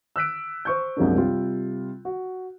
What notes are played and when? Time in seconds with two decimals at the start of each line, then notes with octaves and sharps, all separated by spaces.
0.16 E6 F#6 B6 D7
0.65 C5 C#6 G6
0.97 C2 F#2 F3 G#3 A#3 D4
1.17 C3 G3 F4
2.05 F#4